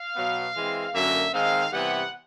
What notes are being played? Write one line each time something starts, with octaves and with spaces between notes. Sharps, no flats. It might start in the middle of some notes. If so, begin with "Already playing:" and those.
Already playing: F5
B2 F#3 B3
E3 G#3 C4
F#2 D3 F#3 A#3 E5
D#3 G#3 C4 D#4 F5
C3 E3 G3 B3 F#5